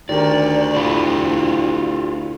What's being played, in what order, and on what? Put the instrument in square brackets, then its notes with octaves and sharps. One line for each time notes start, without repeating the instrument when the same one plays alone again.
[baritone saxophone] D2 [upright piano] D#3 G4 A#4 [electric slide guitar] D5
[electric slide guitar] E4 F4 G4 [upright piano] B5